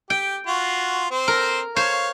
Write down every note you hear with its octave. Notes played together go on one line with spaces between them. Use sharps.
G4 G5
F4 F#4
C4 C5
A#4
C5 C#5 F5